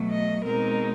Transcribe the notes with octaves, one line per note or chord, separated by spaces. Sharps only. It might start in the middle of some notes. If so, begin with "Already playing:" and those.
Already playing: B2 F#3 A3
D#5
B2 G#3 C4 D#4 A#4